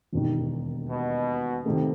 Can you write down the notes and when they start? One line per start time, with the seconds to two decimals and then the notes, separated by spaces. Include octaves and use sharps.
0.13 E1 D#2 D#3
0.89 B2
1.65 C3 D#3 A3